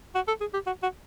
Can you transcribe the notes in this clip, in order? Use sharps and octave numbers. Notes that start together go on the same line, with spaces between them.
F#4
A4
G#4
G4
F#4
F#4